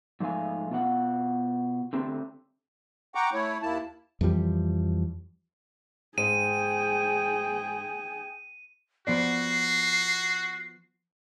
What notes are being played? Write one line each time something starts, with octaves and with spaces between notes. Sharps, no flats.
G#2 F3 A3 F5 G#5
B2 F4 A4 F#5
D3 A3 C4 G4
F#5 G5 A#5 C#6 D6
A3 E4 C#5
D#2 A#3 E4 A5
F2 E3 F3 G3
G#2 G#4 G5 D#7
F3 B3 F#4 D5 C7